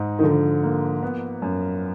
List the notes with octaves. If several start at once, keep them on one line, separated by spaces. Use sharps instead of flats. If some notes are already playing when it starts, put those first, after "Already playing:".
Already playing: G#2 D#4
D#3
D3 F3
A#3
B3
F#2